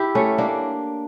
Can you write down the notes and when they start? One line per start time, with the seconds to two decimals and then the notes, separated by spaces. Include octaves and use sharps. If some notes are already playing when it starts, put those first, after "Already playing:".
Already playing: E4 G4
0.15 A3 C#4
0.38 A#3 D4